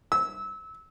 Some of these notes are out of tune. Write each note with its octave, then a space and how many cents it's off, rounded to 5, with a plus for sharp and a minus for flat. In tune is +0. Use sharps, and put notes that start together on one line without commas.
E6 -25